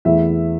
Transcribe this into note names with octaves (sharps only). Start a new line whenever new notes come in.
E2 E3 A3 E4 E5